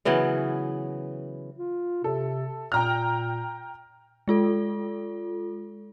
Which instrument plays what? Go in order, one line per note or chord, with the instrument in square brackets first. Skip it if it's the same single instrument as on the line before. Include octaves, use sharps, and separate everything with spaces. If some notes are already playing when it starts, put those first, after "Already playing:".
[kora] C#3 E3 F#3 B3
[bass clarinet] F4
[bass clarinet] C3 [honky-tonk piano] A4
[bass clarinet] A#2 [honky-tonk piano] G5 A#5 F6
[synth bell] G#3 F4 A4